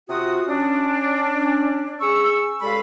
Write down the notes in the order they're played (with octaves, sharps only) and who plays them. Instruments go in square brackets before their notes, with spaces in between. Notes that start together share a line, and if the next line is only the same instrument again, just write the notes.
[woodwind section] C3 F4 F#4 D#6
C#4 D4
G#4 C#6 E6
C#2 G3 G#3 A4 F5 B5